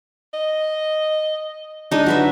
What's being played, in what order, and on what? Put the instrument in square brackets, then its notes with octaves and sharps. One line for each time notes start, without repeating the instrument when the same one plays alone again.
[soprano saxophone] D#5
[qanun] G#3 D4 [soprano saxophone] D#4
[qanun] F#3 B4 E5